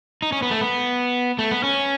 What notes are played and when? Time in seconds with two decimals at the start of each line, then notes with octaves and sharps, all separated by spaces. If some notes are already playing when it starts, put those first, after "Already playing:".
0.22 D#4
0.32 C#4
0.42 B3
0.51 A3
0.61 B3
1.39 A3
1.51 B3
1.64 C#4